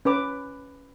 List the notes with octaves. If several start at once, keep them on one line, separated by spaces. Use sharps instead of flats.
C#4 B4 D6